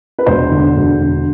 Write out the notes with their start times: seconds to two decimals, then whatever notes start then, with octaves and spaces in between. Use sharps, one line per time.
0.19 B4
0.26 E1 C5
0.51 D3
0.77 E1
1.01 D3